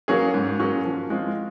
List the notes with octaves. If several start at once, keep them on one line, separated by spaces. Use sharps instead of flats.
F#3 A#3 C#4 G#4
G#2
F#3 A#3 C#4 G#4
F3
G#3 C4 F4